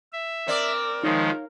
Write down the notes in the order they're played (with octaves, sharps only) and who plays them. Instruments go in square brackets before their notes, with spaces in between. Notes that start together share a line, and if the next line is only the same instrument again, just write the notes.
[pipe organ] E5
[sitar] C4 D5 [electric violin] A#4
[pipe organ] D#3 F3 G#3 [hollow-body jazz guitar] D#4 C#5 F5